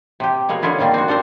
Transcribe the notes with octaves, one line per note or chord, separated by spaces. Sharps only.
C3 G4
B2 G#3 A#3 C#5
D3 G#3 C#4 E4 F4
C3 D#3 G3 A#3 D4
C4 F#4
D4 A4 A#4 C5